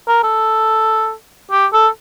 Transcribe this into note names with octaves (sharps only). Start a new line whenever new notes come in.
A#4
A4
G4
A4